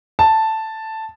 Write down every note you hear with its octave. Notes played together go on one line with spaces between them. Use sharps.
A5